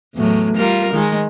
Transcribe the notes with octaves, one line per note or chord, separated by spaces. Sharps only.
E2 A2 F#3
G3 F4 A#4
D#3 G#3